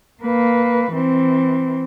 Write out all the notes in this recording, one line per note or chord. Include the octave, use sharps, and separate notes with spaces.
A#3 B4
E3 C4